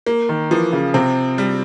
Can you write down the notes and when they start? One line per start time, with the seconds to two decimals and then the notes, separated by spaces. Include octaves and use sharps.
0.07 A#3
0.29 D#3
0.50 E3 F3
0.73 C#3
0.94 C3 C4
1.38 G3